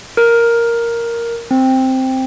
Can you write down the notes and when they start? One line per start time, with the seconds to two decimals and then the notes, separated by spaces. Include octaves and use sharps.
0.17 A#4
1.51 C4